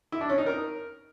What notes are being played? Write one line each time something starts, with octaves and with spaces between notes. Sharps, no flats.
E4
D4
C#4
D#4
A#4